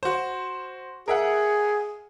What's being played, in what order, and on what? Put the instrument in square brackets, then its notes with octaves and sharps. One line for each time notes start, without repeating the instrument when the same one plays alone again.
[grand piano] F#4 C5
[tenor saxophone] G#4 [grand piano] A#4 E5 F#5